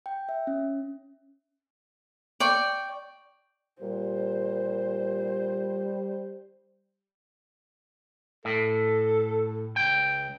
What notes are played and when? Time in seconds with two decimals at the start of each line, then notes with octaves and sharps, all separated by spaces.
0.06 G5
0.29 E5
0.47 C#4
2.40 D5 G5 C#6
3.82 A#2 G3 C5
8.45 A2 A4
9.76 C#2 G5